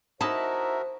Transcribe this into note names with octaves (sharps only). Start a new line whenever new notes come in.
D#4 E4 F#4 A#4 C5 E5 A5